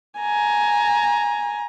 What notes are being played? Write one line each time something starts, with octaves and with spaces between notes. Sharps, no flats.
G#5 A#5